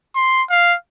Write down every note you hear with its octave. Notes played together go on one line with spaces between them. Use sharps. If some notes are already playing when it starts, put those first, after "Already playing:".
C6
F5